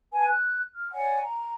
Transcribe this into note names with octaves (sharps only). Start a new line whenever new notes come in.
B4 G#5 A5
F#6
F6
C#5 D5 F#5 G#5
A#5